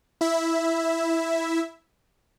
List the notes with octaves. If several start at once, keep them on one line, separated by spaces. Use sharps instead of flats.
E4 E5